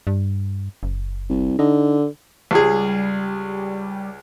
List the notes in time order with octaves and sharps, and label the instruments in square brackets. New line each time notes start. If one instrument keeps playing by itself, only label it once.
[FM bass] G2
F#1
[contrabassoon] C2
[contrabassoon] D3 [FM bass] D#4
[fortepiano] C#2 G#4 [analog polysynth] G3